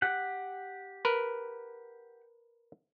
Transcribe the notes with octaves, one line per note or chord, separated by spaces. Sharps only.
G4 F#5
A#4 B4